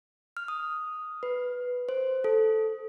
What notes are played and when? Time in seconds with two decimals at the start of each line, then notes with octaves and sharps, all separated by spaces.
0.37 F6
0.48 D#6
1.23 B4
1.89 C5
2.24 A4